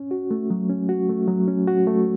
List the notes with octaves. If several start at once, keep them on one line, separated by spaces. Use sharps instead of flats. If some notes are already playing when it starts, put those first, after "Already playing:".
Already playing: C#4
F#4
A3
F#3
C#4
F#4
A3
F#3
C#4
F#4
A3